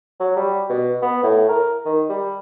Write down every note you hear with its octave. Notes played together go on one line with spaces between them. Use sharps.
F#3
G3
B2
B3
A2
A#4
D#3
G3